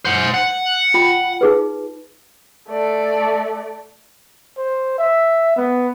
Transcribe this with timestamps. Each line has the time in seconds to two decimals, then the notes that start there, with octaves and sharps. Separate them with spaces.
0.05 C5 F#5
0.34 F#5
0.94 F4 G5 B5
1.41 D#4 G#4 B4
2.68 A3 D5
4.58 C5
4.98 E5
5.56 B3